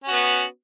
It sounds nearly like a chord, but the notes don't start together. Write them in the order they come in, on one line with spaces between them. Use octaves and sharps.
C#4 F#4 B3